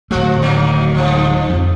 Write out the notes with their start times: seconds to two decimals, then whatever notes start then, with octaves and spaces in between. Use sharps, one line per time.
0.11 D1 F3 A3 F#4
0.42 D#3 F#3 A#3
0.95 G2 F3
1.50 F2